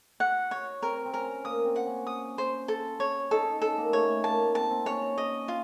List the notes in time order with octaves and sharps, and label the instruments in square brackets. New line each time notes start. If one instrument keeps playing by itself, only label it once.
[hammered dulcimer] F#4 [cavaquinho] F#5
[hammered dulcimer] F#4 [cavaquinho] C#5
[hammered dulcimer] C4 [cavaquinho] A#4
[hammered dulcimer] C4
[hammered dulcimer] C#4 [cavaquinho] A#4
[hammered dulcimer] A#3 [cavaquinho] D#6
[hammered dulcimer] C4
[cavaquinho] F#5
[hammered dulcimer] C#4
[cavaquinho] D#6
C5
A4
C#5
[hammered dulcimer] D#4 [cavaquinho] A4
[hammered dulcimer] C#4 [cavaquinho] A4
[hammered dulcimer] A#3
[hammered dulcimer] A3 [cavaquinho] C#5
[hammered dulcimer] A#3 [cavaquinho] A5
[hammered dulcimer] C4 [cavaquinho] A5
[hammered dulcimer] C4
[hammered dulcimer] C#4 [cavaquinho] C#5
[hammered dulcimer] F#4
[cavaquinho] D#5
F4